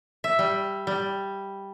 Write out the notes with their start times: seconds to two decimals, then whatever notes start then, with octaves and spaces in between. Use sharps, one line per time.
0.24 E5
0.39 G3
0.87 G3